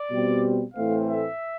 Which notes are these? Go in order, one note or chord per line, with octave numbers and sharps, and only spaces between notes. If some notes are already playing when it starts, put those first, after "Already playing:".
Already playing: D5
B2 G3 C4
A2 E3 A3 C4 F5
E5